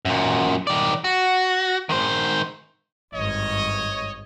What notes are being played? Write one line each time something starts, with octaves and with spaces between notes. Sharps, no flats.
F#2 A#2
D#3 D5
F#4
D#3 C5
G#1 G2 C#5 D#5